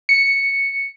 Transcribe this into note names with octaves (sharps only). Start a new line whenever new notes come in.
C#7